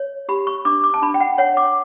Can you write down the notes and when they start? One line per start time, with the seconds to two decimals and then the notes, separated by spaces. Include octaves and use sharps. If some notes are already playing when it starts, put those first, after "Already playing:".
Already playing: C#5
0.29 G4 B5
0.47 C#6
0.65 D4 D6
0.84 D6
0.94 A5
1.02 D4 B5
1.14 G5
1.20 F#5
1.38 C#5 F#5
1.57 D6